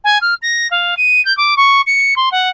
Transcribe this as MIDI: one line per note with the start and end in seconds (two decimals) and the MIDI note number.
0.04 0.18 80
0.21 0.34 89
0.42 0.67 94
0.70 0.94 77
0.97 1.23 99
1.25 1.35 91
1.37 1.54 86
1.56 1.81 85
1.86 2.14 97
2.16 2.29 84
2.31 2.49 78